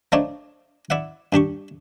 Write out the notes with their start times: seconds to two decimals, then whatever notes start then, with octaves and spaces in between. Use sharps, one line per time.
0.12 F3 A3 D4 D#4 C#5 D5
0.90 E4 D5 E5 F#5
1.33 G2 D4 G4 C#6